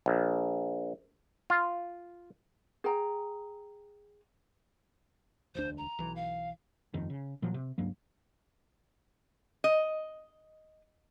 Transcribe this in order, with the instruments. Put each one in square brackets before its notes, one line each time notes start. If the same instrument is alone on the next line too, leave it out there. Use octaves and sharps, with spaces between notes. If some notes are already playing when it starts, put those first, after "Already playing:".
[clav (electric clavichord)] A#1
F4
[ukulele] G#4 G5 A#5
[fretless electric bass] E1 D2 D4 [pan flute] C5
[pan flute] A#5
[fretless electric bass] B1 E3
[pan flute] F5
[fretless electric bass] G1 F2 D#3
C#3
A#2 F3 F#3
C3
C#2 G2 F#3 A#3
[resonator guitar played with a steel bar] D#5